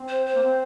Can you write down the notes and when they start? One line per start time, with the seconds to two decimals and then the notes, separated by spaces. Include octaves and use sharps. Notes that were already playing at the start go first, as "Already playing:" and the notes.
Already playing: C4
0.08 C5
0.26 C5
0.35 A#3
0.42 C4